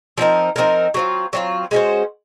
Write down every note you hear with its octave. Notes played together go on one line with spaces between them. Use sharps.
F3 C4 D#4 A#4
F3 C4 D#4 A#4
F#3 C4 F4
F#3 C4 F4
G#3 C#4 F#4 C5